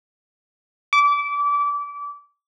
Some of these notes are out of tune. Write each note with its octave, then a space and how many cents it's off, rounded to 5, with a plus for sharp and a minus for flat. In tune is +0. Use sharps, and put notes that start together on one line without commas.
D6 -25